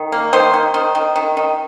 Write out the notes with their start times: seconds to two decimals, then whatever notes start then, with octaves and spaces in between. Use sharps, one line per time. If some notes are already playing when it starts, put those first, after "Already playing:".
Already playing: D#3
0.12 A#3
0.33 D#3 C5
0.54 D#3
0.74 D#3
0.95 D#3
1.16 D#3
1.37 D#3